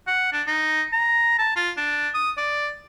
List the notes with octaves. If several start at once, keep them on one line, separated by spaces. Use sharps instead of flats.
F#5
D4
D#4
A#5
A5
F4
D4
D#6
D5